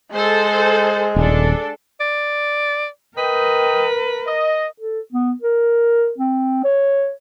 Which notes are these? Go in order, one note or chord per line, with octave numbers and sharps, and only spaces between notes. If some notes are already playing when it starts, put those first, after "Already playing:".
G#3 A4 C5
D#1 D4 A4
D5
A#4 B4 D#5 G5
D#5
A4
B3
A#4
C4
C#5